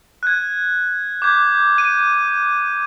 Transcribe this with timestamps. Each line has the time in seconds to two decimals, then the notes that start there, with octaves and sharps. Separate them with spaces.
0.23 F#6 G#6
1.22 D6 G6 G#6
1.78 D#7